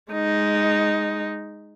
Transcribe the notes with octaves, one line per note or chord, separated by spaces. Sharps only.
G#3 D#4